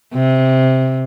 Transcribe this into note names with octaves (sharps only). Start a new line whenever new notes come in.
C3